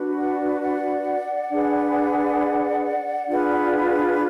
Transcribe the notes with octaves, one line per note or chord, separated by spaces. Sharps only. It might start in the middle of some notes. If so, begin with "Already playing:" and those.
Already playing: D4 F#4 B4
D5 F#5
D5 F#5
D4 G#4 B4
D4 F4 G#4 B4